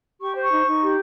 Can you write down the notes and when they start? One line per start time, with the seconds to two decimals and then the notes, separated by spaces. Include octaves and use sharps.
0.20 G4 C#6
0.35 C5
0.43 C#6
0.51 D#4
0.66 D#4
0.81 G4